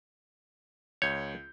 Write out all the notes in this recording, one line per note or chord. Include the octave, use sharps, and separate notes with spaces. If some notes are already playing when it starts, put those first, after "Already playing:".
C#2 C#5 G6